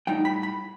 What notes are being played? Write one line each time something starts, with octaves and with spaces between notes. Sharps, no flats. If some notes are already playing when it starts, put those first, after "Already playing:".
A2 G3 D#4 G5
B5
B5